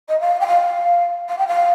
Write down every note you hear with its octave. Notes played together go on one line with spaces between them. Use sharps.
D#5
F5
G5
F5
F5
G5
F5